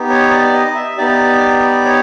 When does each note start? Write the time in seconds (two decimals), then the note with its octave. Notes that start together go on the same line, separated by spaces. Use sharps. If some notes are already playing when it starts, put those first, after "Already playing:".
Already playing: B3 D#4 G4
0.10 C#5
0.31 D5
0.53 D#5
0.75 E5
0.97 B3 D#4 G4 D5
1.85 C#5